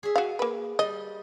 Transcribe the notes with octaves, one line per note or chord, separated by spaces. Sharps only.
G#4 E5
F#4 D#5 F5
A#3 B4
G3 D#5